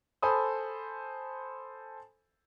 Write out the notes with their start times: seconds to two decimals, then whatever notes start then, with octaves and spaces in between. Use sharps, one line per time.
0.22 A4 C5 G#5 B5 D#6